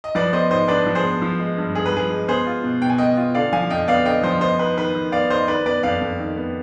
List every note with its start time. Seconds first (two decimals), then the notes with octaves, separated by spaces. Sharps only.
0.04 D#5
0.15 F3 B4 D5
0.33 B3 C5 D#5
0.51 G#2 C5 D#5
0.68 D4 B4 D5
0.86 F3
0.95 G#4 C5
1.04 B3
1.22 F3
1.40 G#3
1.57 G2
1.75 G2 G#4
1.86 B4
1.93 F3 G#4
2.10 G#3
2.28 B3 G#4 C5
2.47 F4
2.64 B2
2.82 B2 G5
2.90 G#5
2.98 B3 D#5 G5
3.17 F4
3.34 D3 D5 F5
3.53 F3 F5 G#5
3.70 F2 D#5 G5
3.88 B3 D5 F5
4.06 D3 D#5 G5
4.23 F3 C5 D#5
4.41 B3 C5 D#5
4.59 D#4 B4
4.77 D#3 B4
4.95 D#3
5.12 B3 D5 F5
5.30 D#4 C5 D#5
5.48 D#3 B4 D5
5.66 B3 B4 D5
5.83 F2 D5 F5
6.01 F2
6.20 D#3
6.37 B3